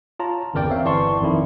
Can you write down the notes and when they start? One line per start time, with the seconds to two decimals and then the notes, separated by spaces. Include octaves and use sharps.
0.20 F4 C#5 A5 A#5
0.54 G1 E2 C#3 A#4 D5 G5
0.70 C4 C#5 E5 F5
0.85 G1 E3 D5 A5 C6 C#6
1.21 G#1 F2 D#3 E4